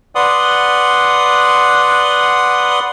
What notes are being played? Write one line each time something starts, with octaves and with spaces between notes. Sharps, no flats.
B4 D5 F#5 C6 D#6